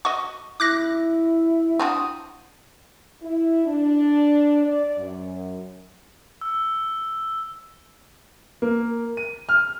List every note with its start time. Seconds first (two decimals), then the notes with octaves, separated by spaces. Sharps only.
0.05 F#4 D#5 C#6
0.60 E4 D6 F#6 A#6
1.80 C4 D4 F#4 D#6
3.22 E4
3.65 D4
4.63 D5
4.97 F#2
6.41 E6
8.62 A#3
9.17 D#7
9.49 F6